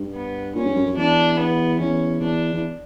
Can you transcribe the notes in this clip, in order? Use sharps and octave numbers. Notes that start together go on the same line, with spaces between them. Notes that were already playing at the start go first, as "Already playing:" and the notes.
Already playing: G2
B3
A#2 C#4
G2
F#2
F#2
E2 D4
B3
E2 C#4
E2 D4
E2